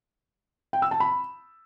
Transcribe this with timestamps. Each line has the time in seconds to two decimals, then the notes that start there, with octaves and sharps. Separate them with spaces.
0.73 G5
0.82 E6
0.91 A5
1.00 B5